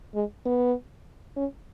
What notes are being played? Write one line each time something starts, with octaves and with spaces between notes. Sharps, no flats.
G#3
B3
C#4